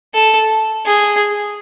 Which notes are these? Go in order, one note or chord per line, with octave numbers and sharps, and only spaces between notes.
A4
G#4